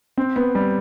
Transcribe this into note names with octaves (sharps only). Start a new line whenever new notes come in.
C4
B3
G3